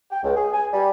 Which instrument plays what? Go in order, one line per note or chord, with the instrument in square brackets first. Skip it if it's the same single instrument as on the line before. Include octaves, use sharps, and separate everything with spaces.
[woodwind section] G5
C#2
G#4
G#5
G3